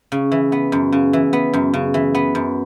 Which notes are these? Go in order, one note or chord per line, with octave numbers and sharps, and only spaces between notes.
C#3
E3
B3
F#2
C#3
E3
B3
F#2
C#3
E3
B3
F#2